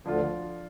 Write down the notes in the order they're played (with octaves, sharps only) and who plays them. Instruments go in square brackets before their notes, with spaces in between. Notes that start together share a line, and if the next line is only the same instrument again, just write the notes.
[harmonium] D2 D3 [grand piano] F3 D4 F4